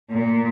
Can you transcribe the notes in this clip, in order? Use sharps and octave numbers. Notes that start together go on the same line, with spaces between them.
A#2